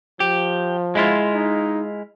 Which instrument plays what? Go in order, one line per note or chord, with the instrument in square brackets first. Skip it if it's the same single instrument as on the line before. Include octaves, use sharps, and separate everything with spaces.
[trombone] F3 [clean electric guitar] G4
[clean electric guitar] G#3 E4 F4
[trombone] D#4